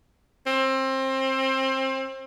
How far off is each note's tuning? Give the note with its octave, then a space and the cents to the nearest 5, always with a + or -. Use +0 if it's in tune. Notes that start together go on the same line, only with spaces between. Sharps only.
C4 +25